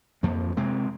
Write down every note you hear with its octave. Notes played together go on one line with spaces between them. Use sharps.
F2 F3 A#3
C3 G#3 C4